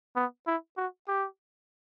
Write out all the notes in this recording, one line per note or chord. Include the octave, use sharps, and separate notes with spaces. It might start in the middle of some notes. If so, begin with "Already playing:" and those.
B3
E4
F#4
G4